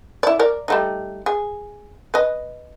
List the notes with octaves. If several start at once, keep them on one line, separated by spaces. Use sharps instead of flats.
E4 D5
A#4 D5
G3 A3 D#4
G#4
B4 D#5